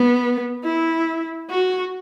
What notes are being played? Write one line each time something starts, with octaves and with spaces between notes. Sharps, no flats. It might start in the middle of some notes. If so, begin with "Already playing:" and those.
Already playing: B3
E4
F#4